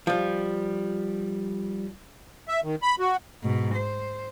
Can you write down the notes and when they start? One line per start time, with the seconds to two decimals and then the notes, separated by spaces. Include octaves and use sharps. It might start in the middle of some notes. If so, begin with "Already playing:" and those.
0.07 F3 G3
2.48 E5
2.64 D#3
2.82 B5
2.99 F#4
3.43 G#2 B2
3.75 C5